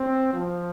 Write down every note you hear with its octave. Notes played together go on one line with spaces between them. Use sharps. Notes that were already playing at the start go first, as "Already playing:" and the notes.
Already playing: C4
F3